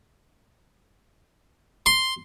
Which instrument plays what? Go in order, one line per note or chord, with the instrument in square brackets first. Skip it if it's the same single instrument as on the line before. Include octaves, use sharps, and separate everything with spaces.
[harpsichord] C6